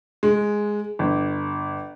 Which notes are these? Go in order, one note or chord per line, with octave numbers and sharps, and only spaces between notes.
G#3
G1